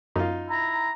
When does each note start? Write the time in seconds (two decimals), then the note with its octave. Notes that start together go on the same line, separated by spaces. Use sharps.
0.16 F#2 D#4 F4
0.49 E4 A#5